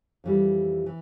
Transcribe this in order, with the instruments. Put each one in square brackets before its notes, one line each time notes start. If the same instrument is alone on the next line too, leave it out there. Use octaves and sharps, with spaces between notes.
[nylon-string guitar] F2 E3 G3
E3